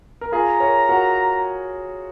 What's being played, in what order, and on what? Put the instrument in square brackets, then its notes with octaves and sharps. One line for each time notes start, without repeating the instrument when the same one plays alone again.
[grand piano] A#4
[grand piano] F4 G#4 [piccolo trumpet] A#5
[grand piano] A#4 C#5
F#4 A#4